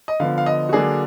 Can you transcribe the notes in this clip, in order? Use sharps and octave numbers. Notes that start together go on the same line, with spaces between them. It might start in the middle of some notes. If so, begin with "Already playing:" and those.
D#5
D3 F3 B3 F5
F5
D#5
F#4
D3 F#3 A#3 D4 G#4